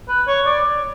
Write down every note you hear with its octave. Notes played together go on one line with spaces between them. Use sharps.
B4
C#5
D5